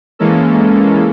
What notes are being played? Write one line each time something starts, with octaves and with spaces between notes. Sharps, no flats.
E3 G#3 A#3 C#4 A4